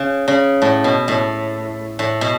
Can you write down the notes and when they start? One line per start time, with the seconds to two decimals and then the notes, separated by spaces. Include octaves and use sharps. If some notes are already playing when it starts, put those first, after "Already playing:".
Already playing: C#3
0.28 C#3
0.62 A2
0.84 B2
1.08 A2
1.99 A2
2.21 B2